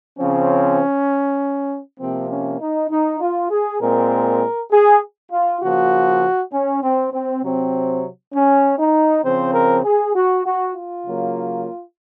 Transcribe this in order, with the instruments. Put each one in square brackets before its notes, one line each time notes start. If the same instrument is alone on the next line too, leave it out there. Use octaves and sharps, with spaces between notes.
[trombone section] C#3 F3 C4 C#4
C3 F3 A#3 C4
C#4
D#4
D#4
F4
G#4
A#2 G#3 C4 A#4
G#4
F4
C#3 F3 A#3 F#4
C#4
C4
C4
C3 F#3 C4
C#4
D#4
C#3 F3 C4 C5
A#4
G#4
F#4
F#4
F4
C#3 F#3 A#3